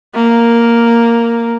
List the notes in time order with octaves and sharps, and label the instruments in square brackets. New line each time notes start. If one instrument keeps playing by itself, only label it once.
[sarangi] A#3